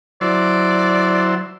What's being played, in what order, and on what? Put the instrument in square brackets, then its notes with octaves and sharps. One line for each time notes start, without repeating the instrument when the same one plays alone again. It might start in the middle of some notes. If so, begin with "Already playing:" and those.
[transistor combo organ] F#3 E4 C5 [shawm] D5